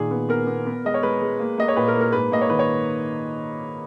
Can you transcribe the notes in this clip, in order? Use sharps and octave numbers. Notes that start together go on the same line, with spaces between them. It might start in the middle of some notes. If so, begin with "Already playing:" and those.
Already playing: A#2 D#3 G#4
B3
B3 A#4
B3
B3
G#3 D#5
C#5
G#3 B4
G#3
A#3
A#3 D#5
C#5
A#2 B4
A#4
A#3
A#4
G#2 B4
A#3 D#5
C#5
D#3 B4
C#5